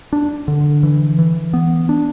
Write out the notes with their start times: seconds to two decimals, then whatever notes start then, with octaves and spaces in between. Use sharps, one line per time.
0.13 D4
0.48 D3
0.83 E3
1.19 E3
1.54 B3
1.89 D4